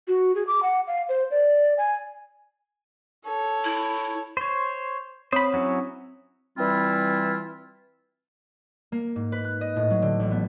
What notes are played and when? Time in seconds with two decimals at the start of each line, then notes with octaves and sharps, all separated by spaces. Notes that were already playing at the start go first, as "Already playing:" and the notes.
0.08 F#4
0.35 G#4
0.47 D6
0.63 F#5
0.87 F5
1.09 C5
1.31 D5
1.78 G#5
3.25 A4 C#5
3.65 E4
4.37 C5 C#5
5.32 C4 C5 C#5 B5 D#6
5.54 F#3 C#4 E4
6.58 E3 G3 C4 E4 F4
8.92 A#3
9.16 G#2
9.32 B4
9.44 F#6
9.61 D#5
9.76 A2
9.90 F#3
10.02 D3
10.20 A1
10.31 B3